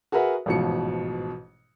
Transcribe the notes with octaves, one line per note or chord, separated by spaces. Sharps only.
F#4 G#4 A#4 B4 E5 F#5
A1 G#2 B2 F3 C#7